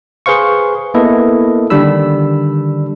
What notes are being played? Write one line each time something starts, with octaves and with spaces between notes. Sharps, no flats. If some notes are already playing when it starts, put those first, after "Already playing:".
G#4 B4 C5 F5 C#6
A#3 B3 E4 A4 B4 D#5
D3 D#3 G3 D4 B5 E6